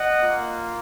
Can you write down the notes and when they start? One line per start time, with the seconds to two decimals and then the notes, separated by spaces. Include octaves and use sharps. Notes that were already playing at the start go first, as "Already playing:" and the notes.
Already playing: D#5 F#5
0.20 A#3 F4